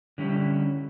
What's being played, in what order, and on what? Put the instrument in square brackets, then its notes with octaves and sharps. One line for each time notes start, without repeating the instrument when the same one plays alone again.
[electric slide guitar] D3 G3 C#4 E4